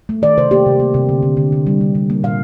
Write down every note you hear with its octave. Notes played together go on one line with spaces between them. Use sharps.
A3
D#3 D5
C3 C5
A#3 G4
C3
A#3
C3
D3
D3
D3
D3
G3
D3
G3
A#3
A#2 F5